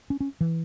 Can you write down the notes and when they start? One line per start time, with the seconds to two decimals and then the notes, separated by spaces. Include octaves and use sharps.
0.10 C#4
0.20 C#4
0.41 E3